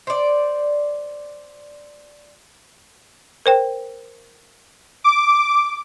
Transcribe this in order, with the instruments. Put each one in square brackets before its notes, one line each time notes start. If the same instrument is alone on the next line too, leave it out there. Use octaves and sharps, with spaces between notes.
[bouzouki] C5 D5
[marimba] A#4 C5 G5
[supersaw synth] D6